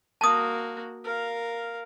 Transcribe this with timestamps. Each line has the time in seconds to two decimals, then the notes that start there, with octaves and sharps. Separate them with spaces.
0.21 A#3 F#4 A5 D#6
1.04 A#4 F5